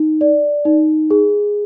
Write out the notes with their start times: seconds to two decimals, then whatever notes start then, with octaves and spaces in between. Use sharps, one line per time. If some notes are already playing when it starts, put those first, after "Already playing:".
Already playing: D#4
0.21 D5
0.65 D#4
1.11 G#4